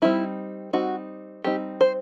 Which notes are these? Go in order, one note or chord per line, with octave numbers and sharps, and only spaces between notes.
G3 C4 D#4 E4
G3 C4 D#4 F#4
G3 C4 D#4 G4
C5